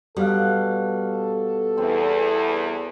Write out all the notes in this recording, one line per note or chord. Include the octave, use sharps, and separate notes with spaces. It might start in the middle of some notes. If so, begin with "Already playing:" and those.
B2 G3 A4 F5
E2 C4